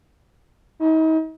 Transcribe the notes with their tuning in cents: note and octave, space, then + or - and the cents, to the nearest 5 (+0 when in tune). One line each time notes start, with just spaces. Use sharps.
D#4 +40